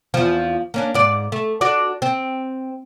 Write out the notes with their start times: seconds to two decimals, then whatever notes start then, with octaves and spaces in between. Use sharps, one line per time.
0.14 E2 F3
0.74 A#3 C#4 D4
0.94 G#2 D5
1.32 A3
1.61 D4 F#4 D5
2.02 C4